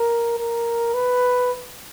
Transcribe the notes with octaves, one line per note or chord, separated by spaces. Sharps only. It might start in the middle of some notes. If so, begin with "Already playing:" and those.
Already playing: A#4
A#4
B4